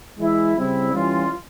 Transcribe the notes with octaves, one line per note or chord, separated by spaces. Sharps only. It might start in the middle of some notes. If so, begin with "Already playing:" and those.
E3 G#3 E4
C#3 G3 C4 E4
E3 G3 C#4 F4